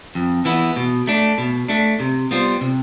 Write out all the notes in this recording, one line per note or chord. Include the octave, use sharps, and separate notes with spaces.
F2
E3 B3 E4
B2
A3 D4
B2
A3 D4
C3
G3 B3 F4 C5
C3